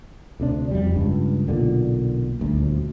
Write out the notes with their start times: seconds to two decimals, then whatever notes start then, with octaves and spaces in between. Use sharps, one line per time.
0.40 D2 C3 D4
0.71 F2 G3
0.96 C#2 G2
1.48 B1 A#2 D3
2.39 D#1 D2